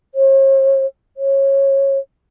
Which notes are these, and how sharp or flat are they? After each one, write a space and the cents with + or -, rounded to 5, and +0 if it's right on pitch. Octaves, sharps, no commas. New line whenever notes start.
C#5 -40
C#5 -20